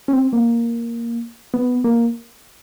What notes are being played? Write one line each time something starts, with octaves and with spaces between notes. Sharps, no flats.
C#4
C4
A#3
B3
A#3